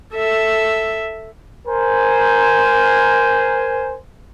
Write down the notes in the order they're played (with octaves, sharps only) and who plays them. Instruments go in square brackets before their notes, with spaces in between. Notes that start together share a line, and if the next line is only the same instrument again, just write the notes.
[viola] A4 E5
[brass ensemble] A#4 C5 G#5